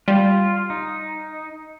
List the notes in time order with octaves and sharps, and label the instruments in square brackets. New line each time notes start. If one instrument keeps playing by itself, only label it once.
[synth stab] G3 [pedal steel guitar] F4
[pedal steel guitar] D#4